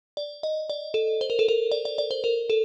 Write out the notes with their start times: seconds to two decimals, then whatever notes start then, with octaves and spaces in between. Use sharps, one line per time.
0.17 D5
0.43 D#5
0.70 D5
0.94 A4
1.21 C5
1.30 A#4
1.39 A4
1.48 A#4
1.71 D5
1.85 D5
1.98 D5
2.11 C5
2.24 A#4
2.50 A4